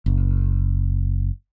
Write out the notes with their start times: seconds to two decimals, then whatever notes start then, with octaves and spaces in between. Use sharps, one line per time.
0.06 F#1